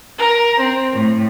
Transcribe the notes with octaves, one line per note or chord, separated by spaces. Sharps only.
A#4
C4
A2